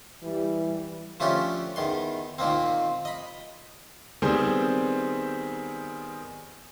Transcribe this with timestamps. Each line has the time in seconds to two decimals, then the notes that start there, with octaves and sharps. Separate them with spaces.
0.23 E3 G3
1.20 F3 A3 C#4 D4 G4
1.76 E2 D#3 C6
2.39 A#2 D#3 A#3 C4
3.05 D#5 B5
4.22 D#3 G3 B3 C4 G#4 C5